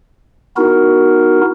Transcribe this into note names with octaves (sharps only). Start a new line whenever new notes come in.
B3 D#4 E4 F#4 A#4